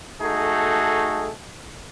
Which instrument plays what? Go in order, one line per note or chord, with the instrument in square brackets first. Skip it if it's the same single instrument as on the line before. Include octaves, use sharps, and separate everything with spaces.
[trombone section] A3 D#4 F#4 G#4 A4